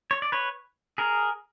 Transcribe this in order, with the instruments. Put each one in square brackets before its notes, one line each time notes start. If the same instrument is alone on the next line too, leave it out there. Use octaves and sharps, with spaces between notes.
[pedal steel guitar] C#5
D5
B4 C#5
G#4 A#4